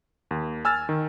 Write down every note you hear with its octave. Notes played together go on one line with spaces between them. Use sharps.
D#2
G#5 E6 F6 A6
D#3